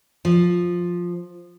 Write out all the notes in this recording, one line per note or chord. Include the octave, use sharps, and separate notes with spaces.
F3